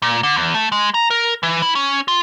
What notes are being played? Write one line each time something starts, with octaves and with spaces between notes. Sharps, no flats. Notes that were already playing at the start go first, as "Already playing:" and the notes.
A#2
D3
E2
A3
G#3
A#5
A#4
E3
E4
C#4
F4